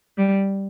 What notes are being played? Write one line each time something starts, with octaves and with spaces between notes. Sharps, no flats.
G3